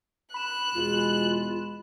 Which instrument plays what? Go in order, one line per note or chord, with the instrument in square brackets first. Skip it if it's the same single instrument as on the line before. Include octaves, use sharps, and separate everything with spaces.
[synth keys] B5 E7 [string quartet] F#6
[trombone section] E2 B2 G#3 [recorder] F4